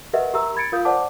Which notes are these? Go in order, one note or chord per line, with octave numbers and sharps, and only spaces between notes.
G4 A#4 B4 D#5 E5 F#5
G4 A#4 E5 A#5 E6
B5 G#6 A6 C#7 D7
F4 A#4 F5 D#6 G6
C5 D5 F#5 A5 D6